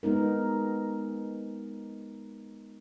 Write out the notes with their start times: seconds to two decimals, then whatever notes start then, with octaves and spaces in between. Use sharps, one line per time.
0.03 G#3 B3 D#4 A#4